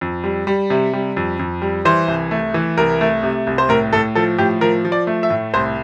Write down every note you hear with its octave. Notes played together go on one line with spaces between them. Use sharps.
F2
G3
G3
C3
G3
F2
F2
G3
E3 C5
C2
A3
E3
C2 A#4
A3
C3
C2
C5
A2 A#4
A2 A4
F3 A4
A2 G4
F3 A#4
F3
D5
A3
E5
A2
C2 C5